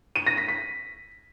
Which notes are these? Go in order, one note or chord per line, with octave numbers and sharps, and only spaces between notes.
D#7
A#6
B6
B6